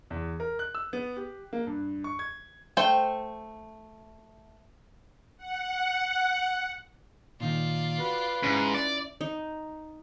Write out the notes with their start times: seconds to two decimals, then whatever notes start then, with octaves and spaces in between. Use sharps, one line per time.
0.10 E2
0.40 A#4
0.59 F#6
0.75 E6
0.93 B3
1.17 G4
1.53 A#3
1.67 G2
2.04 C#6
2.19 G#6
2.77 A3 C5 G5
5.38 F#5
7.40 A#2 D#3 D#4 F4 D5
8.00 F#4 B4
8.43 G#2 C#4 D#4 E4
8.74 D5
9.21 D#4